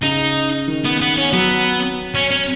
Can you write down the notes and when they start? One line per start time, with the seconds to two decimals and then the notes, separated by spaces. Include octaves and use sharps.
0.02 C#3 D#4
0.68 D#3
0.85 B3
1.01 B3
1.17 C#4
1.33 F#3 B3
2.15 C#4
2.31 C#4